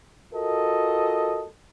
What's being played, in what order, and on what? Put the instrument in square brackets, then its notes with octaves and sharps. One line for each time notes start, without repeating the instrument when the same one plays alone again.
[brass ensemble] F4 F#4 A4 A#4 D#5